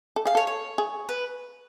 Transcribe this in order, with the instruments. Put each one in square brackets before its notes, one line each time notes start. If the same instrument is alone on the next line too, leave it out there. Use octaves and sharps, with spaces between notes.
[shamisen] A4
[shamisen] G#4 [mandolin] F5
[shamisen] A4 [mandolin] C#5
[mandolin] C#5
[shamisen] G#4
[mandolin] B4